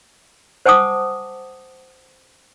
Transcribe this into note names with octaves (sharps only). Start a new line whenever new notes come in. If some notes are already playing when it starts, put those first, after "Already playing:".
C5 F#5 G#5 A5 D6 D#6